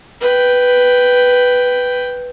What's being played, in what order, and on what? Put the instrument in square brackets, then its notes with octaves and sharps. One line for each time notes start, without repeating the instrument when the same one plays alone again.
[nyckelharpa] B4 G5